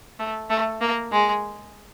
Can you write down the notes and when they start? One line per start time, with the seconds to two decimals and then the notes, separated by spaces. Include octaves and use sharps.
0.19 A3
0.50 A3
0.81 A#3
1.12 G#3